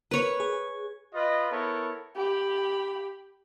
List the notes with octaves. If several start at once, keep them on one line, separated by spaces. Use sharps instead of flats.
A#4 B4 C#5
G#4
F4 B4 D#5
B3 E4 A4 A#4 C#5
G4 B5